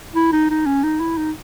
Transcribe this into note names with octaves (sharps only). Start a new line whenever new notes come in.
E4
D#4
D#4
C#4
D#4
E4
D#4